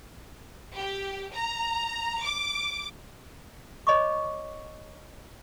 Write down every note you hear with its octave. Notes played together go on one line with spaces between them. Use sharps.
G4
A#5
D6
C#5 D#5 B5 C#6 D6